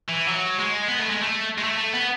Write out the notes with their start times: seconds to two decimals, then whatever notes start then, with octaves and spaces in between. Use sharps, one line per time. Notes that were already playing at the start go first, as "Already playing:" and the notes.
0.08 E3
0.28 F#3
0.59 G#3
0.88 B3
0.99 A3
1.10 G#3
1.22 A3
1.58 G#3
1.63 A3
1.78 A3
1.93 B3